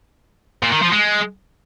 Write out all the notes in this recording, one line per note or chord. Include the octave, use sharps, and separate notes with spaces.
A#2
D#3
F3
G#3